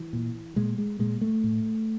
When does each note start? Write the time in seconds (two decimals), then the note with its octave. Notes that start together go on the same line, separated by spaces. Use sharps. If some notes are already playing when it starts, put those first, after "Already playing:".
Already playing: E3
0.13 A#2
0.56 A#2 G#3
0.78 G#3
0.99 A#2 G#3
1.21 A3
1.44 A2